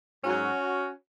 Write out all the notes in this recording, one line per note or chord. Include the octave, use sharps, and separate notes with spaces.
G#2 F#3 C#4 F#4